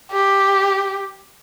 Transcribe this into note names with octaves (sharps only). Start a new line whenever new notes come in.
G4